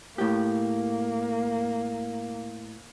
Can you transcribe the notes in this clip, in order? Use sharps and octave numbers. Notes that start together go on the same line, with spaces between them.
A2 A#3 G4